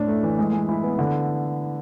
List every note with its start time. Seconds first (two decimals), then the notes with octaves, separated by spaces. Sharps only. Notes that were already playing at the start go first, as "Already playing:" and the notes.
Already playing: A2 D4
0.08 A3
0.23 E3
0.39 G#3
0.53 G#3
0.69 E4
0.83 B3
0.99 D3